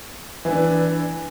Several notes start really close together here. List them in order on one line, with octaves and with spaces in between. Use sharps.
E3 E4 D4